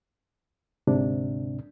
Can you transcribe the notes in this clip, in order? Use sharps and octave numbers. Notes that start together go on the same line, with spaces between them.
D2 G#2 C3 D4